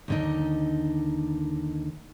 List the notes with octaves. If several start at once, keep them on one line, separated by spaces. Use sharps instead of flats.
D#2 D3 D#4